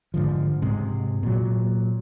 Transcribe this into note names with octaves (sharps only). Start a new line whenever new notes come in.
G#2 D3 F3
G#2 C3 G#3
A#2 F#3